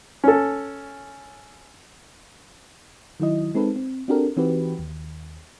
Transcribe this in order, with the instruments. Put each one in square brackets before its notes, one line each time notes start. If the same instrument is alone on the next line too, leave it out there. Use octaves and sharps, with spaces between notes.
[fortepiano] C#4 A4
[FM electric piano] D#3 F#3 E4 D#5
G#3 C4 D#4 A4 B4
C4
C4 D4 F#4 G4 A4 A#4
E3 C4 D#4 F#4 G4 B4
D#2